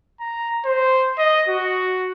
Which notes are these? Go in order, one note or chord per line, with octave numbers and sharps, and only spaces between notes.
A#5
C5
D#5
F#4